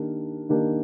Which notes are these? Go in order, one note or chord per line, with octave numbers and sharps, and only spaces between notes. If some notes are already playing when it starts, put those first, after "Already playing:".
Already playing: D#3 A#3 D4 G4 A#4
D#3 A#3 D4 G4 A#4